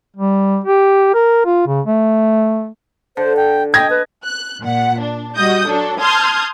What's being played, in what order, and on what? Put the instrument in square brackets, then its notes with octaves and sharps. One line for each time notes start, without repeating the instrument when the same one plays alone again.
[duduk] G3
G4
A#4
F4
C#3
A3
[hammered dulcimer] D3 [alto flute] C5
[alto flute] G5
[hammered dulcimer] D#5 [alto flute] G5 [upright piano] G#6 A#6
[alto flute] B4
[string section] F#6
A#2 F#5
D4
G3 F#4 D#5 D#6 G6
F#3 D4 A4
A5 C6 D#6 F6 G6 G#6